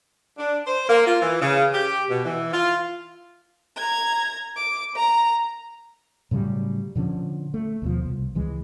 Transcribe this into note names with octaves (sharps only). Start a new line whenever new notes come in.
D4
C5
A#3
F4
E3
C#3
G4
B2
E3
F4
A#5 G#6
D6
A#5
A2 C#3 F#3 G3
A#2 D3 F3 C#4
A3
D#2 B2 F3
C2
C#2 E3 G#3